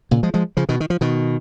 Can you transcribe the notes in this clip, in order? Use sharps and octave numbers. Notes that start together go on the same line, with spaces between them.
A#2 C#3
F3 G#3
F3 G#3
C#3 F3
B2 D#3
D#3
F3
B2 D#3